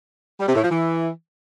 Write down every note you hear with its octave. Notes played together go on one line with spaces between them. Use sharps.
G3
C3
A2
F3
E3